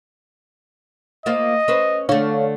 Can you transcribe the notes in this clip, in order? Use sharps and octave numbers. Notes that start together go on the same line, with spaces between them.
A#3 F4 C5 D#5
C#4 B4 C5
D3 A3 D4 C#5 F5